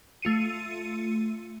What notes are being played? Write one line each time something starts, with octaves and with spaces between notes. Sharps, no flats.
A3 F4 C#7 D#7